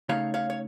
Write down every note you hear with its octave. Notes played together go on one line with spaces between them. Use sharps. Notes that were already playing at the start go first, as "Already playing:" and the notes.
C#3 A3 D#4 C#5 F5
C#5 F5
C#5